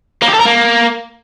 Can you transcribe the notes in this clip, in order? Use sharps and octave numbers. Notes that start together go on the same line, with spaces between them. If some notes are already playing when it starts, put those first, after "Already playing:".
A#3
G4
A4
A#4
A#3